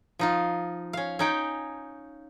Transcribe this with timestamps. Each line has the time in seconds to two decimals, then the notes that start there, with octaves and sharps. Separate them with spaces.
0.19 F3 D#4 F4
0.93 C#4 F5
1.19 C#4 D#4 G5